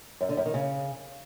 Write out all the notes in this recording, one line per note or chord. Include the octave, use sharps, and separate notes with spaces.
F#2
D3
F#2
D#3
C#3